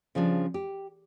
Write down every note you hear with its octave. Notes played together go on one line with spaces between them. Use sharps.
C#3 F3 G3 D4
G4